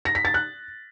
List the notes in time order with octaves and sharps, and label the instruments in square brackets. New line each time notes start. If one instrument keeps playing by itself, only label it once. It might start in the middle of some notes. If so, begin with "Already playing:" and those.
[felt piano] A#6
B6
A6
F#6